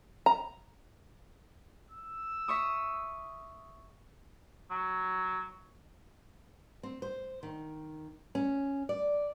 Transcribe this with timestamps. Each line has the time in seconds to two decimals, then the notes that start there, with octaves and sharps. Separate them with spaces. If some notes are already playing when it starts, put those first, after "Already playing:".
0.26 A#5
1.91 E6
2.48 E5 C#6 D#6
4.70 F#3
6.83 C4
7.02 C5
7.43 D#3
8.35 C#4
8.89 D5